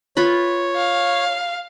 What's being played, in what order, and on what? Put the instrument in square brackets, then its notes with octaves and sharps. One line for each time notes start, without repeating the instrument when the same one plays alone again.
[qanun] F4 B4 B5 [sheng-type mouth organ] C#5
[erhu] F5